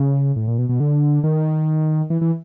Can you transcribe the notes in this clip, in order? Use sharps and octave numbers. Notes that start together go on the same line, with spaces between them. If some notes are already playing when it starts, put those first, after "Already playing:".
Already playing: C#3
A2
A#2
B2
B2
D3
D#3
E3
E3